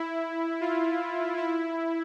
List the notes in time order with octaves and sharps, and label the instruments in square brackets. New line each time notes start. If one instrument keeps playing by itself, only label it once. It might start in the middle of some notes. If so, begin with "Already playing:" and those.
Already playing: [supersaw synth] E4
F4
E4